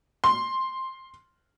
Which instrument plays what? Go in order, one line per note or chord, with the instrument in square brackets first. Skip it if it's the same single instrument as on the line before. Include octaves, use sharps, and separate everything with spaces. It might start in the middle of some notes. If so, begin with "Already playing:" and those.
[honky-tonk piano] C6